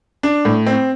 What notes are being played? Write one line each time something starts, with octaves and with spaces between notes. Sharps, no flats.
D4
A2
C4